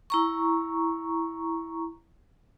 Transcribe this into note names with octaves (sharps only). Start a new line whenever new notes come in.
E4 A#5 C#6